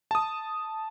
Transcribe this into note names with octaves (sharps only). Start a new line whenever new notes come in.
A5 D#6